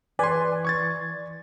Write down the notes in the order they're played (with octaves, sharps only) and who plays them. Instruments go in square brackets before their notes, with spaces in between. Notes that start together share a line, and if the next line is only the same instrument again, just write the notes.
[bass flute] E3 [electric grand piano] B4 C6 [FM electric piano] D5 [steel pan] G#5
[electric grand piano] C#6 G#6 A6